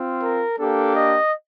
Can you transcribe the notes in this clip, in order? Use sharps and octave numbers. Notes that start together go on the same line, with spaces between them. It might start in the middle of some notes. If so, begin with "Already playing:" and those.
Already playing: C4 F4
A#4
A#3 D4 G4 A4
D#5